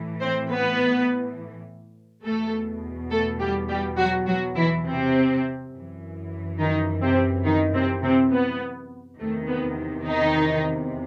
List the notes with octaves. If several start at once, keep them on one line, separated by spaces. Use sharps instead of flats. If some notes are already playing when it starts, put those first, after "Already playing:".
Already playing: A2 E3
C4 C5
B3 B4
E2 B2 A3 A4
A3 A4
G3 G4
G3 G4
F#3 F#4
F#3 F#4
E3 E4
C3 C4
F#2
E3
D#3 D#4
C3 C4
D#3 D#4
C3 C4
C3 C4
B3
E2 C3 D#3 A3
B3
D#3 D#4